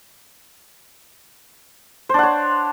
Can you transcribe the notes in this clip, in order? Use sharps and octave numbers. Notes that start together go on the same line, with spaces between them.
D4 C5 C#5 F#5